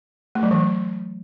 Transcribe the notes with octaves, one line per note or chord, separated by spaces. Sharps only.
A3
F#3
E3